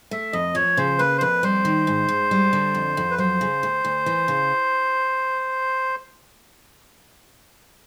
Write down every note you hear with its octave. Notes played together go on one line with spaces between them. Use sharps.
A3 E5
F2 D#5
F3 C#5
C#3 C5
A#3 B4
C5
F2 B4
G3 C5
D#3
G#2
G#2
G3
D3
F2
F2
B4
F#3 C5
C#3
D2
D2
E3
C#3